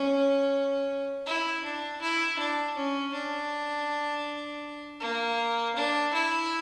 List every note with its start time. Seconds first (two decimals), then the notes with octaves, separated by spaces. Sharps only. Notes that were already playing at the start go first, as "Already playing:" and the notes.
Already playing: C#4
1.26 E4
1.64 D4
2.01 E4
2.39 D4
2.76 C#4
3.14 D4
5.01 A#3
5.76 D4
6.13 E4